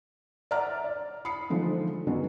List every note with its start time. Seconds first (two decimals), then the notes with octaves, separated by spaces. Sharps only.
0.51 D5 E5 F#5 A#5 F6 A6
0.84 D5
1.25 B5 D#6 C7 C#7
1.50 D3 F3 G#3 A3 D4 D#4
2.07 D3 D#3 F#3 G#3 B3 C#4